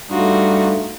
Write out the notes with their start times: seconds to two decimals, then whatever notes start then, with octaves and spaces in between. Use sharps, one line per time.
0.10 G2 G3 A3 D#4 F4 F#4